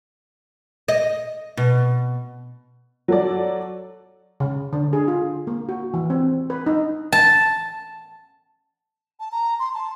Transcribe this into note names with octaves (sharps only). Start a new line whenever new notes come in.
D#5
B2
F#3 A4 D5
C#3
D3
G#4
F4
A#3
F#4
E3
C4
B4
D#4
A5
A5
A#5
C6
A5